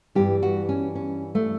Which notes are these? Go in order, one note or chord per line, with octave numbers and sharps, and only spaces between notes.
G2 E3 G4
F#4
C#4
C#4
A3